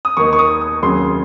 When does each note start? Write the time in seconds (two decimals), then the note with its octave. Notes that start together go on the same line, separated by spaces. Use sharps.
0.05 D#6
0.17 D#2 D#3 A#3 D#4 C#6
0.33 C#6
0.39 D#6
0.61 D#6
0.82 F1 D#2 C#3 F#3 C6